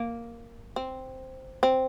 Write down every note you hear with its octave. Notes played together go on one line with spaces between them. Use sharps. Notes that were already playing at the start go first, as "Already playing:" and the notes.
Already playing: A#3
C4
C4